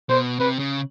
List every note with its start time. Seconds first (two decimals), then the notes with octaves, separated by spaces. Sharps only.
0.10 B2 C5
0.40 C3 B4
0.59 C#3